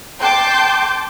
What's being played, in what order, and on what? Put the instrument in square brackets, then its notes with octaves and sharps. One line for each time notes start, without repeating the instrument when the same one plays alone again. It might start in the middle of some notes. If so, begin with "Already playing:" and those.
[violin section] G5 A5 C6 D6 G6